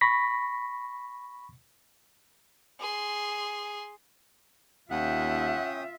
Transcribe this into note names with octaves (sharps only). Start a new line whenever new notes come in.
B5 C#6 A#6 B6
G#4 C6
D#2 C#4 F4 E5 F#5 G5 D#6